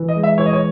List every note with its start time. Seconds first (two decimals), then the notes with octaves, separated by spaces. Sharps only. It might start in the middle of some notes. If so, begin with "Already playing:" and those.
Already playing: E3
0.09 D#5
0.16 G#3
0.23 E5
0.38 E3 C#5
0.46 D#5
0.53 C#5